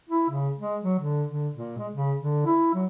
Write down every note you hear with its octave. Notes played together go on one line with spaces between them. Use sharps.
E4
C#3
G#3
F#3
D3
D3
A#2
G#3
C#3
D3
E4
F#3